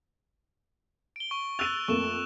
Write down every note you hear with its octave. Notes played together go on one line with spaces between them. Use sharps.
D7 G7
C#6
E6 F#6 A6 D#7 F7
F2 A3 A#3 C#6 E7